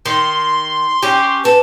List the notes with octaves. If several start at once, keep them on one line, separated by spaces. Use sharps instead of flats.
D#3 C6
C#4 G4
A4 B4